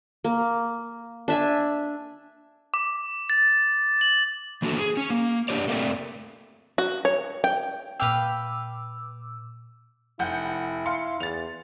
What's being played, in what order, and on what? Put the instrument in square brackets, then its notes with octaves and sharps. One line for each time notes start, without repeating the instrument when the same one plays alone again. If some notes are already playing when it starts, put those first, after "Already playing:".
[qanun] A#3
D4 E5 G#5
[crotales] D6
A6
F#7
[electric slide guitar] E3 A#3 D4 F#4 A4
G#4
C#4
A#3
D4 G4 C#5 D5
A3 A#3 C4 D5
[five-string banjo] F#4
C#5
G5
[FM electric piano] A#2 D6 E6 [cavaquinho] B4 F5 G5
[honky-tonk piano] F1 F#5 G6 [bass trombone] E4
[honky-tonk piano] F5 C6 C#7
[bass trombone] E2 [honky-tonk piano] A6 F7